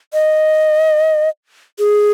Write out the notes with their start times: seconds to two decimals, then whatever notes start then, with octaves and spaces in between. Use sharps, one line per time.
0.13 D#5
1.79 G#4